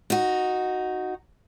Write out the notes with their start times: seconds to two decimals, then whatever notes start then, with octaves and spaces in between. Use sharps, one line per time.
0.10 D#4 F#4